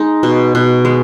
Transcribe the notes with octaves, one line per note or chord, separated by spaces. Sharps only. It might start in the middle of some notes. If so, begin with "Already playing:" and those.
Already playing: G#3 D#4
B2
B2
G#3